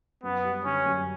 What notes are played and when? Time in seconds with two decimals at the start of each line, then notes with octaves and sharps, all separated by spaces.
0.23 F#2 B3
0.45 G3
0.65 D3 C#4
0.86 F#2